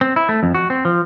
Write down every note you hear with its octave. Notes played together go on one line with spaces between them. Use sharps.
C4
E4
A3
F2
F#4
C4
F3